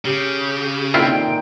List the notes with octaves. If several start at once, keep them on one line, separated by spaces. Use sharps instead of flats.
C#3 G4
A#2 D#3 C4 E4 F4 G5